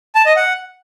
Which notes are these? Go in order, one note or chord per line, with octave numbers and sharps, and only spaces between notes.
A5
D#5
F#5